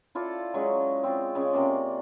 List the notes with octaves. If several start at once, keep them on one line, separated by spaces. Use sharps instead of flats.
E4 F4 A4 D5
F#3 G#3 C#4
C4 F4
C#3 G#3 C#4
C3 A#3 D5